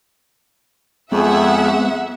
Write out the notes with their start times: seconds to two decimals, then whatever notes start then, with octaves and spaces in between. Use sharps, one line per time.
1.12 F2 G#3 B3 C4 G#4 E5 F#5